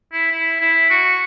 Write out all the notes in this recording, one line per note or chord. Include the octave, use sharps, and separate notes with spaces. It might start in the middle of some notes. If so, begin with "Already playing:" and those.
E4
E4
E4
F#4